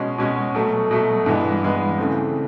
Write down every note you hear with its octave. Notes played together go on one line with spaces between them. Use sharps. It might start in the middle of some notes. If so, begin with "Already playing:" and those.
Already playing: B2 G#3 C#4 F#4
B2 G#3 C#4 F#4
B2 F#3 A3
B2 F#3 A3
G2 E3 G#3 B3
G2 E3 G#3 B3
C#3 E3 A3 C4